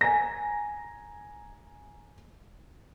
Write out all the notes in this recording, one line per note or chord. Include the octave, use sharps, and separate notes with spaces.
G#5 A#5 A#6